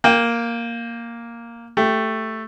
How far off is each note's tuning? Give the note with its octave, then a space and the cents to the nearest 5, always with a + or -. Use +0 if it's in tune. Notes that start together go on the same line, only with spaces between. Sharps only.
A#3 +0 G5 +20
A3 +5 G4 +0